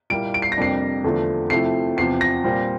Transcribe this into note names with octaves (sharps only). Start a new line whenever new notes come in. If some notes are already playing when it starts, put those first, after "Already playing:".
A#2 G3 A#3 E4 D7
D7
C7
A#6
F2 C3 G3 A#3 D4 C7
E2 D3 F3 A3
C3 F3 A3 E4 C7
E2 C3 F3 C7
A#6
A#2 G3 C4